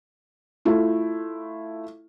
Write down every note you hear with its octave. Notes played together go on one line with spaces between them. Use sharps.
A3 E4 F4